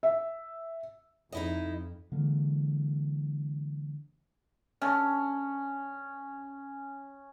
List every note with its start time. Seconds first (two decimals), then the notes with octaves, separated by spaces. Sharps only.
0.03 E5
1.32 F2 D#4 E4 D#5
2.12 D3 E3 G#3 A#3
4.82 D3 A3 C#4